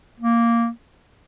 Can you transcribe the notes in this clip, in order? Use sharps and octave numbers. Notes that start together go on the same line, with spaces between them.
A#3